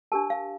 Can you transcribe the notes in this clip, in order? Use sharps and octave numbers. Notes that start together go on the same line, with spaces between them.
D4 G4 A#4 A5
F5